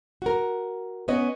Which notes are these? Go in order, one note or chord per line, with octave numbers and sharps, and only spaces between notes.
F#4 A#4
B3 C#4 B4 D#5